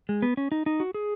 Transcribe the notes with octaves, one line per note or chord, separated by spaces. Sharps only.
G#3
B3
C#4
D#4
D#4
F#4
G#4